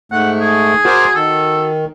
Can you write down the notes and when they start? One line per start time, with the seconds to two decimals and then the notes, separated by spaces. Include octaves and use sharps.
0.12 G#2 A3 F#5
0.41 G#4
0.85 F#4 A#4 C5 D5
1.15 D#3 A4